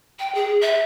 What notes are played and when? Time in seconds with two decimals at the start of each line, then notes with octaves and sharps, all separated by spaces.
0.19 G5
0.35 G#4
0.61 E5